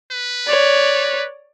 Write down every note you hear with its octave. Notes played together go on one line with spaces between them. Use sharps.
B4
C#5 D5